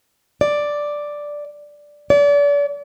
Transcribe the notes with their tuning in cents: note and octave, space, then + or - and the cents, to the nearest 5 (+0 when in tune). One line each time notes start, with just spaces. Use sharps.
D5 +0
D5 -35